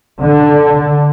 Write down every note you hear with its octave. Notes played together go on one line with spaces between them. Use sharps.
D3